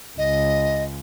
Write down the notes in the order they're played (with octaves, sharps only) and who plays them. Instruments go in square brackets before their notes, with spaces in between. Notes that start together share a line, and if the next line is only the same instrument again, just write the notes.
[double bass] C#2 [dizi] D#5